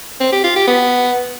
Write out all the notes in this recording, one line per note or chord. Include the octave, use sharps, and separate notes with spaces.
C4
G4
F4
G4
B3